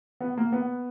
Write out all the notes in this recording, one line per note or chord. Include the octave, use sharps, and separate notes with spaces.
B3
A#3
B3